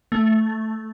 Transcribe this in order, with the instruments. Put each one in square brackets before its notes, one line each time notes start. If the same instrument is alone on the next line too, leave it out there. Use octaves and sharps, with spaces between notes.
[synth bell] A3